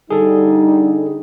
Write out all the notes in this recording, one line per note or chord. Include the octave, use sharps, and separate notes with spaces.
D3 G3 D#4 G#4 A4